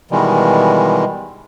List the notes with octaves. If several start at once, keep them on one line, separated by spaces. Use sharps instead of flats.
B2 D#3 E3 G3 G#3